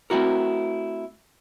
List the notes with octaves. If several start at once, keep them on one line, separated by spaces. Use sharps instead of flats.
A3 C4 E4 F#4 A#4